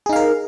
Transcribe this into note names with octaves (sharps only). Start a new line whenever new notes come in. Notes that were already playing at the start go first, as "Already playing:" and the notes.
D#4 G#4 A#4 F5